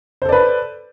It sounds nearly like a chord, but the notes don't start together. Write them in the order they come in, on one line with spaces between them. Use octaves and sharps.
C5 A4 D5 B4